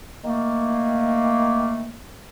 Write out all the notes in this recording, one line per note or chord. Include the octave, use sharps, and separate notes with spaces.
D#3 A3 A#3